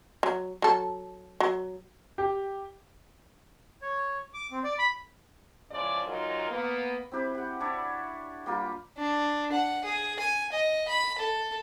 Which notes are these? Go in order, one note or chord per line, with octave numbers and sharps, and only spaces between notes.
F#3
F#3 A4
F#3
G4
C#5
D6
C4
D5
B5
E2 C#3 F3 G#3 D5
G#2 F#3 D#4 F4 A#4
A#3 B3
C4 E4 G4 B4
G4 F#5
D4 E4 C#5 D5
G3 A#3 F4 G4
D4
F#5
G#4
G#5
D#5
B5
A4